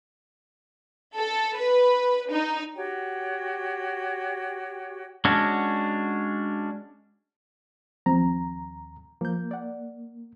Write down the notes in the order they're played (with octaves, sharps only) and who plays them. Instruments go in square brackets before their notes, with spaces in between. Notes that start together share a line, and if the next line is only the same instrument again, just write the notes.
[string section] A4
B4
D#4
[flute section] F#4 G4 C#5 G5
[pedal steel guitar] G#3 C#4 D4 F#4
[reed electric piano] D#2 A#5 [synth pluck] F3 C4
[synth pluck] F3 G6 [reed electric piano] A#3
[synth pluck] D5 F#5